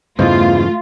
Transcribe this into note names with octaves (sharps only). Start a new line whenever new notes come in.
E2 G2 C#3 E3 A3 F4 C5 D#5